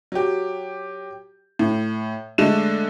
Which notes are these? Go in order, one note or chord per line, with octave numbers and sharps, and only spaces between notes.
F#3 G4
A2
D3 G#3 A3 E7